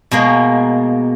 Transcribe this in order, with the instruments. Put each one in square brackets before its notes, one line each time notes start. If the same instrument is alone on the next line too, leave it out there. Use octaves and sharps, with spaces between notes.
[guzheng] B2 G#3 A#3